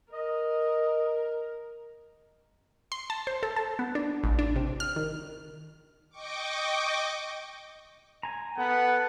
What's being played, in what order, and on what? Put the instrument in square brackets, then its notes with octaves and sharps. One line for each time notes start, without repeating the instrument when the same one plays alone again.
[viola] A#4 [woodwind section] D#5
[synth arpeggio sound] C6
A5
C5
A4
A5
B3
D4
A1
D4
C3
F6
D#3
[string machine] D#5 G5 C#6 D6
[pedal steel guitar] G#5 A#5
[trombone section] B3 [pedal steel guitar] A4 [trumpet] F#5